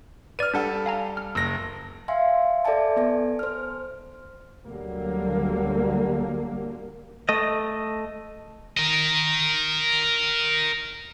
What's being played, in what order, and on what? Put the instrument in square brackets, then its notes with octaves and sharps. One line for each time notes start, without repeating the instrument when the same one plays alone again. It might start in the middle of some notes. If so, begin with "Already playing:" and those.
[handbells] B4 D5 [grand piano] F6 D#7
[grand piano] G3 A4 A5 [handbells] D4 F#5
[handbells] F5 G#5 A#5
F6
[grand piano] F#1 A#6 [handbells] E6
[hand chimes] E5 F5 G#5 C6
A4 D5 E5 G#5 A5
B3 A4 G#5
C5 F6
[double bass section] D2 D3 F#3 G3 A#3
[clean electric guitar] A3 D#5
[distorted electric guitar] A#4 D#5